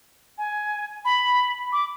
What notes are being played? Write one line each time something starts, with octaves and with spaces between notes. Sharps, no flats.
G#5
B5
D6